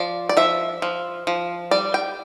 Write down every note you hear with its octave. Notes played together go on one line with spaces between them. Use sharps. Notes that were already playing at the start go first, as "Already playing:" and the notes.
Already playing: F3 D5
D5
F3 E5
F3
F3
G3 D5
G5